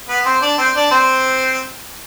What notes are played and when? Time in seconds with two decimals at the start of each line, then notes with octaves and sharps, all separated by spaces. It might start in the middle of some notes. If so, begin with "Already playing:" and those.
0.09 B3 B4
0.26 C4 C5
0.42 D4 D5
0.58 C4 C5
0.75 D4 D5
0.91 C4 C5